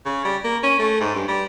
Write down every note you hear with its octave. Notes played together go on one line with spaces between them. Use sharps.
C#3
G3
A#3
C#4
A3
G#2
G2
G3